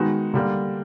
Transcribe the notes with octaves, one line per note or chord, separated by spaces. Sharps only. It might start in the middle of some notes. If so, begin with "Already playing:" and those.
Already playing: D#3 G#3 B3 D#4 F#4
D3 G3 A#3